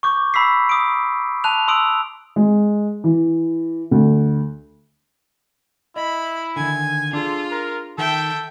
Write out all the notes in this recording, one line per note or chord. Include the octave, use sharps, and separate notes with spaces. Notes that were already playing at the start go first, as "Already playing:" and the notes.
C#6 D6 G6
A#5 B5 E6 B6 C7
D#6 D7
A5 F#6 F7
C6 D#6 E6 D7
G#3
E3
D2
E4 D#5 B5
D3 D#3 G#5
D4 F4 G#4 A4
A#4
D#3 A4 E5 G5